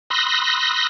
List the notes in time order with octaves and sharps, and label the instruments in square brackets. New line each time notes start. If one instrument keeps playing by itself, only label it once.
[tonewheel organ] B5 C6 D#6 E6 F#6 A#6